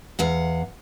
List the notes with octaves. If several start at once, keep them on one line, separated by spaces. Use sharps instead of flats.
E2 F5 F#5